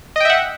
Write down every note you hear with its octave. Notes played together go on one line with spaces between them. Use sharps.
D#5 E5 F#5 G5